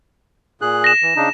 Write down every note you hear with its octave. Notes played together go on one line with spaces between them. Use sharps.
A#2 G#4 F#6
A#6 E7
E3
C#3 D4 D#4